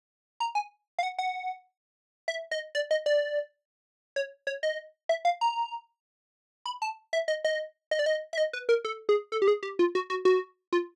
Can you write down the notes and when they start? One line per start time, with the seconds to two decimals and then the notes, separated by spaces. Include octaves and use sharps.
0.40 A#5
0.55 G#5
0.99 F5
1.03 F#5
1.19 F#5
2.28 E5
2.51 D#5
2.75 D5
2.91 D#5
3.06 D5
4.16 C#5
4.47 C#5
4.63 D#5
5.09 E5
5.25 F5
5.41 A#5
6.66 B5
6.82 A5
7.13 E5
7.28 D#5
7.45 D#5
7.91 D#5
7.99 D5
8.06 D#5
8.33 E5
8.38 D#5
8.53 B4
8.69 A#4
8.85 A4
9.09 G#4
9.32 A4
9.42 G4
9.48 G#4
9.63 G4
9.79 F4
9.95 F#4
10.10 F#4
10.25 F#4
10.73 F4